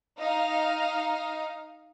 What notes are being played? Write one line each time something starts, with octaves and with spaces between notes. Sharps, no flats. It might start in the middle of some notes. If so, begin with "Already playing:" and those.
D#4 F5